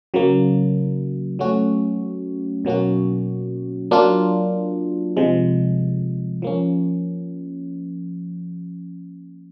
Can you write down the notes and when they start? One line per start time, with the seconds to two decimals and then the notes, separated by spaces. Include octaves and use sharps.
0.14 C#3 F#3 A#3
1.39 F#3 A3 C#4 F#4
2.65 B2 F#3 A#3 C#4 F#4
3.91 F#3 A#3 D4 F4
5.17 C3 F3 G#3
6.42 F3 A#3 C#4